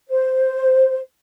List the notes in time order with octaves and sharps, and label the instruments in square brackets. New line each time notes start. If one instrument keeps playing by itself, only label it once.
[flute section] C5